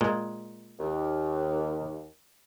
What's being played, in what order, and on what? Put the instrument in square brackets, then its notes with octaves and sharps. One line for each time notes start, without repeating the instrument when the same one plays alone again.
[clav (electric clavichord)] A#2 G#3
[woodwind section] D#2